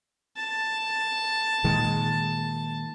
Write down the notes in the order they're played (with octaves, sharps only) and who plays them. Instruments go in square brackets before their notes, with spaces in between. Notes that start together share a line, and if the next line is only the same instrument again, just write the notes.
[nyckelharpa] A5
[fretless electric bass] A#2 D#3 G#3